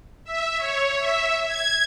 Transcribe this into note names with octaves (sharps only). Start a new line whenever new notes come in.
E5
C#5
E5
G#6